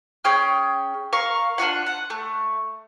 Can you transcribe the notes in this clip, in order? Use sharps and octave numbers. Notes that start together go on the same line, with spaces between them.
C#4 G#4 G5 F6
A#4 F5 C#6
D4 F4 F#4 F#5
F#5
A3